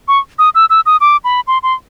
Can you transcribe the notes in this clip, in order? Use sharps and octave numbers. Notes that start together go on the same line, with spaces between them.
C#6
D#6
E6
E6
D#6
D6
B5
C6
C6